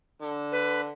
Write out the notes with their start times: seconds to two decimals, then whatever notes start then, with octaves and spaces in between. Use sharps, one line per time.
0.22 D3
0.52 B4